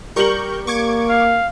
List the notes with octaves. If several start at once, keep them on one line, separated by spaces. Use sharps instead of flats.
G3 G4 A#4 C#6 G6 F#7
A#3 C#6 D6 G#6
F5